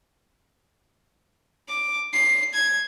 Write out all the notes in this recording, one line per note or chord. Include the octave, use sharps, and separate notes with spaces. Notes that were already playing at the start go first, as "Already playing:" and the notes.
D6
C7
G#6